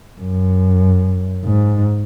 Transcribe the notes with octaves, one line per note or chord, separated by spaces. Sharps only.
F#2
G#2